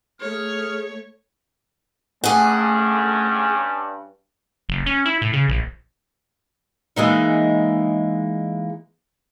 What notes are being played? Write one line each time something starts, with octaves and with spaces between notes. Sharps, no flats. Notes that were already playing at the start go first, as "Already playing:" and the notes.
A3 G#4 C#5 F6
G2 A3 C#4 G#4 F#5
F#1
C#4
E4
A2
C#3
A#1
E3 G#3 A#3 D#4